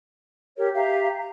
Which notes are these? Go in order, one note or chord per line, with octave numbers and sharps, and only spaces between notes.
G4 A#4 C#5
G4 E5 F5 A#5
A#5